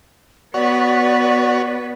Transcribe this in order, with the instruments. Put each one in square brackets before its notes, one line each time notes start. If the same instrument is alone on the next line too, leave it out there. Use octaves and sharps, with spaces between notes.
[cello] B3 B4 [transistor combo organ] F#4 C#5 [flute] D5